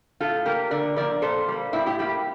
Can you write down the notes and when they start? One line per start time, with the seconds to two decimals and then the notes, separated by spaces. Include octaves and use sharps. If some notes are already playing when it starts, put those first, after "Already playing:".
0.20 A2 F4 A4
0.45 G3 A#3 G4 A#4
0.71 D3 A#4 D5
0.96 F3 A#3 A#4 D5
1.22 A#2 A4 C5
1.48 G3 A#3
1.73 A2 C4 E4
1.86 E4 G4
1.99 G3 A#3 E4 G4